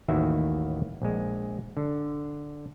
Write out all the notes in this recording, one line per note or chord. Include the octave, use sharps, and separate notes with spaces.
A1 D#2 D#3 E4 F#4 E5
A#1 G#3
D3